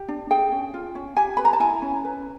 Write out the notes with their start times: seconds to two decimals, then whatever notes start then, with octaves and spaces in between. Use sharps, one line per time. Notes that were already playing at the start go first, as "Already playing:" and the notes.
Already playing: G4
0.08 D4
0.30 G#4 G5
0.52 C#4
0.74 F4
0.95 C#4
1.17 G4 G#5
1.37 B4 B5
1.45 A#5
1.53 A5
1.60 E4 G#5
1.82 C#4
2.04 B4